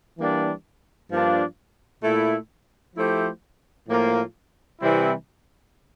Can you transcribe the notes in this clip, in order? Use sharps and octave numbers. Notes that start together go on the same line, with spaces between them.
E3 G3 A#3 D4
G2 F3 A#3 D4 F4
A#2 A3 E4
F3 A3 E4 G4 C5
A2 F3 A#3 F4
C3 E3 G3 C4 E4